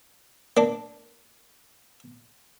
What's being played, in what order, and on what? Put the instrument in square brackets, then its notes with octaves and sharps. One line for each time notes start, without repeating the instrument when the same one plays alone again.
[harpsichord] A#3 D4